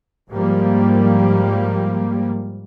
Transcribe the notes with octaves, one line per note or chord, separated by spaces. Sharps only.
G#2 F3 G3 A#3